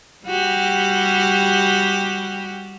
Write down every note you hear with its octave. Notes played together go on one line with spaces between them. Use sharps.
G3 F#4 G4